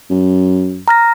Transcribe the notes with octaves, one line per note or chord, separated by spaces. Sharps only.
F#2
A#5 F6 A#6